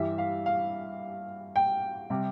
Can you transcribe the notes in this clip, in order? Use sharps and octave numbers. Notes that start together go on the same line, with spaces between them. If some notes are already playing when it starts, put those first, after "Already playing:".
Already playing: G2 E3 G3 E5
F5
F5
G5
C3 G3